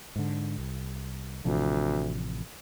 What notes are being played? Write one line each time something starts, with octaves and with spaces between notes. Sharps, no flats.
G#2 D3
C2
A1 D2 C3 F3